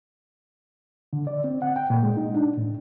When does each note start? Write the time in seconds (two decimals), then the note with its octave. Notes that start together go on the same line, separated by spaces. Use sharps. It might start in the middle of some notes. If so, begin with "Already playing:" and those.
1.13 D3
1.27 D5
1.44 C4
1.62 F#5
1.76 G5
1.90 A#2
2.03 G#3
2.17 D#4
2.34 D4
2.57 A2